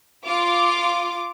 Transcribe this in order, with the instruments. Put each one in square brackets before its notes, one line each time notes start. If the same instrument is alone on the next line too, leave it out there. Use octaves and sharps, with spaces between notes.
[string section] F4 D6